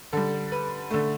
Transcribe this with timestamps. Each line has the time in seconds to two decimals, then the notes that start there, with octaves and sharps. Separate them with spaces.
0.13 D3 G3 A4
0.52 B4
0.91 D3 A3